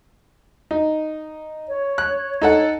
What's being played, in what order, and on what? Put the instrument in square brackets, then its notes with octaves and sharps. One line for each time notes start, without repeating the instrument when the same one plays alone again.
[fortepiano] D#4
[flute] C#5
[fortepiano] F#6
D#4 A4 F#5